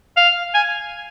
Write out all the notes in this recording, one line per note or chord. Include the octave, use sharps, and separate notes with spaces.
F5
G#5